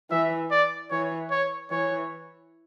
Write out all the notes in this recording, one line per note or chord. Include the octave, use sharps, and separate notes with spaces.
E3 E5
D5
E3 C#5
C#5
E3 C#5